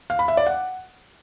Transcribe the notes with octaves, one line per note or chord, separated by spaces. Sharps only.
F5
B5
E5
D5
F#5